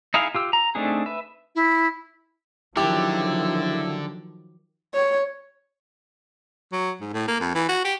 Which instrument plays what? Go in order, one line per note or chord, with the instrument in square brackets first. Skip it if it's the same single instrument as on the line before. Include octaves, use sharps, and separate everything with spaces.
[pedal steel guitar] D#4 E4 G#4 F5
F4 G4 E6
A#5
A3 C4 D4 D#4 G#4
B4 E5
[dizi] E4
[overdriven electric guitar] D3 D4 [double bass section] D#3 F3 F#3 [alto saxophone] E4 [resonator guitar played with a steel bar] G4
[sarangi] C#5
[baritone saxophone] F#3
G#2
A2
A#3
F2
E3
F#4
G4